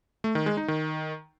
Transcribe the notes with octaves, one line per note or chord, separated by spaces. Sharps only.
A3
D#3
G#3
D#4
D#3